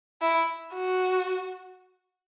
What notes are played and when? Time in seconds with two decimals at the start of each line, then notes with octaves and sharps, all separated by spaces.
0.21 E4
0.75 F#4